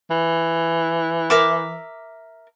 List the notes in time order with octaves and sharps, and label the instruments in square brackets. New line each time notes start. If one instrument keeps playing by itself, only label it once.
[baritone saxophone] E3
[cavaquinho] A#4 E5 D6